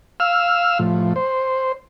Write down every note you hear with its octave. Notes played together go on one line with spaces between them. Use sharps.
F5 E6 F6
A2 F3
C5